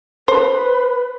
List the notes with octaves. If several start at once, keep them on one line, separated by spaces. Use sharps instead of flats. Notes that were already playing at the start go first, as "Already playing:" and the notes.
B4 C5